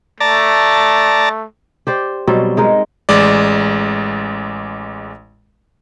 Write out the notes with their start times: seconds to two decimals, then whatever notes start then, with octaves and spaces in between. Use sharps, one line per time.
0.20 A3 D5 A5 A#5
1.87 G4 C5 D5
2.27 B2 F#3 G3 C4
2.57 G#3 D#4 A#4
3.09 A1 G#3 D5